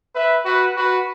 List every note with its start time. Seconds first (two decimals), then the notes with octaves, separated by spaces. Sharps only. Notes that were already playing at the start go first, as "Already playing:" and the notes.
0.15 B4 E5
0.46 F#4 B4
0.76 F#4 B4